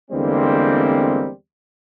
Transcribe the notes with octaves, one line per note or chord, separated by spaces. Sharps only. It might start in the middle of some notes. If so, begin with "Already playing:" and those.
E2 D3 G3 G#3 A#3 C4